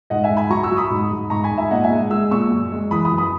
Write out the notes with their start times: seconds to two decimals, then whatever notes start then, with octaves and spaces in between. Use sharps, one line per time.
0.10 G#2 D#5 F#5
0.23 E5 G#5
0.30 G#2
0.37 G#5 B5
0.50 F#3 A#5 C#6
0.63 C#6 E6
0.71 F#3
0.77 B5 D#6
0.90 G#2
1.10 G#2
1.30 G#2 A#5 C#6
1.44 G#5 B5
1.51 G#2
1.57 E5 G#5
1.71 A#2 D#5 F#5
1.84 E5 G#5
1.91 G#3
2.11 G#3 E6
2.31 A#2 C#6 E6
2.51 F#2
2.71 G#3
2.91 E3 B5 D#6
3.05 B5 D#6
3.12 F#2
3.18 B5 D#6